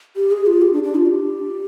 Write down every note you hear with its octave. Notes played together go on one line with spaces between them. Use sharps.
G4
G#4
F4
G4
D4
D4
F4
G4